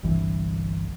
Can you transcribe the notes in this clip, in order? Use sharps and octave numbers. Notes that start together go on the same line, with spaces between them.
G1 C2 E3